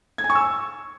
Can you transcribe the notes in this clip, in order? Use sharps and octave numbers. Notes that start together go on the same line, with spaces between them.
G#6
G#5
C#6
E6